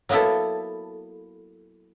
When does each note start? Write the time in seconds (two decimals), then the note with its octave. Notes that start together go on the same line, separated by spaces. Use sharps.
0.09 F#3 A#3 B3 E4 A4